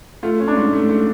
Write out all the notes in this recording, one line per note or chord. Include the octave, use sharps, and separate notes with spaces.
A3 F4
C#4
D4
G#2
A3
A3